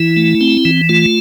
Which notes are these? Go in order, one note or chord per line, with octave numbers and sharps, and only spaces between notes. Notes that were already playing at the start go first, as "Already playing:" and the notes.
Already playing: E3 E4
A3
C4
E3
A3 F4